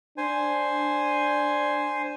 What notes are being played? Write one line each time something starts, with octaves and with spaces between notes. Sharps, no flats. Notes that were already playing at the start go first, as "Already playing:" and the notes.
D4 C5 G#5